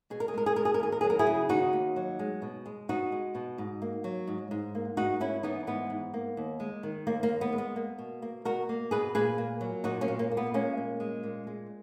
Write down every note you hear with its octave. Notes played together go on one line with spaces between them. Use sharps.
B2 G#4
A#4
G#4
G#3 A#4
G#4
B2 A#4
G#4
A#4
D#2 G#4
A#4
F#3 G#4
A#4
E4 G#4
C#3
D#2 D#4 F#4
D#2
F#3
G#3
B2
G#3
B2 D#4 F#4
G#3
B2
G#2
A#3
F#3
G#2
G#2
A#3
G#2 D#4 F#4
A#3 C#4 E4
E3 B3 D#4
G#2 B3
G#2
A#3
D#2
G#3
D#3
D#2 A#3
A#3
D#2
B3
G#3
B3
A#3
B2
A#3
B2 F#4 A#4
A#3
B2 G#4 B4
A#2 G#4 B4
A#3
F#3
A#2 D#4 F#4
A#3 C#4
A#2
A#3
A#3
B3
G#3 A#3 C#4
A#2
G#3
A#2
G#3